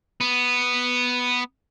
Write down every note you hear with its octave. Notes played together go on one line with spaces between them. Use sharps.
B3